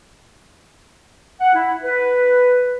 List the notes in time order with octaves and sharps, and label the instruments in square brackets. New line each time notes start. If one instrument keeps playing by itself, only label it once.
[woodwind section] F#5
E4
B4